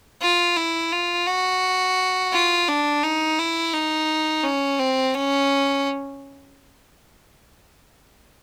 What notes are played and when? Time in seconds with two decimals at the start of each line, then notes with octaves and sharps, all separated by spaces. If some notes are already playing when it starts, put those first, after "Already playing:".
0.21 F4
0.56 E4
0.92 F4
1.27 F#4
2.33 F4
2.68 D4
3.03 D#4
3.39 E4
3.74 D#4
4.44 C#4
4.79 C4
5.14 C#4